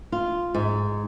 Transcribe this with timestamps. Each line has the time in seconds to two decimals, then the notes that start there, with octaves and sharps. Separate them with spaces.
0.12 F4
0.55 G#2